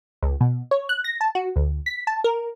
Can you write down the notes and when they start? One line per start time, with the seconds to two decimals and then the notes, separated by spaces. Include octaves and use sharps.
0.22 C#2
0.41 B2
0.71 C#5
0.89 F#6
1.04 A#6
1.21 A5
1.35 F#4
1.56 D2
1.86 B6
2.07 A5
2.24 A#4